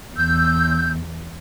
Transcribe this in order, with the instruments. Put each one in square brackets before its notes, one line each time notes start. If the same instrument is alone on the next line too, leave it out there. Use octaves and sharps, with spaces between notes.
[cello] E2 [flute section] E6 G6